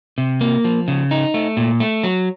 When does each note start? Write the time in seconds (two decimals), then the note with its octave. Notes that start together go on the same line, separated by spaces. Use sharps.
0.18 C3
0.41 A#3
0.64 F3
0.88 C#3
1.11 D#4
1.34 A3
1.57 A#2
1.80 A3
2.04 F#3